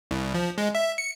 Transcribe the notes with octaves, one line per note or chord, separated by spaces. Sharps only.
C2
F3
G#3
E5
C#7